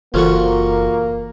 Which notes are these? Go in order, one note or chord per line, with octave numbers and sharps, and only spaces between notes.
F#1 E3 A#3 F4 F#4 A4 C5 C#6